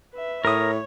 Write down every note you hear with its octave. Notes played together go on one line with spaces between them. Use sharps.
B4 E5
A2 A#4 C#5 D#6